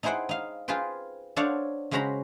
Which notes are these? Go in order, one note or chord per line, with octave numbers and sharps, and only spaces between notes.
D#4 E4 G#4 C5 F#5 G5
D#4 F5
F4 G#4 B4 C5 G5
D4 A4 C5 C#5 F5 F#5
C#3 G#3 F#4 C5 A#5 B5